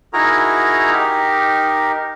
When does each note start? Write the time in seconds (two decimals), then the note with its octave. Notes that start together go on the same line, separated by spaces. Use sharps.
0.13 D#4 E4 F#4 G#4 A#4 A#5
0.92 D#4 G4 A#4